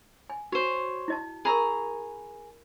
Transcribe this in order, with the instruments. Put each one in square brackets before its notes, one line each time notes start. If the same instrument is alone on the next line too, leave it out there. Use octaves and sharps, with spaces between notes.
[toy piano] G#5
[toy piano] F#4 [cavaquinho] C5 C#5
[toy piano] E4 D#5 A5
[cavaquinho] G#4 A#5 C#6 [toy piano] A#4 B5